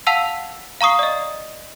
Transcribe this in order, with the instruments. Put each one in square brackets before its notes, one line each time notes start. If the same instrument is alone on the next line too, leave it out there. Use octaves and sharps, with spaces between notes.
[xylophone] F5 F#5 A5 E6 B6 F7
F5 A#5 C#6 D#6 C7
D5 D#5